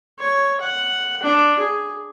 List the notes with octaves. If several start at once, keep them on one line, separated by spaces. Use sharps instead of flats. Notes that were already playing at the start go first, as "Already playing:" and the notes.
C#5
F#5
D4
G#4